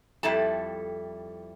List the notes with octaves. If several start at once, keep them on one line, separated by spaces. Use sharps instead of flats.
F2 G3 E4 A4 A5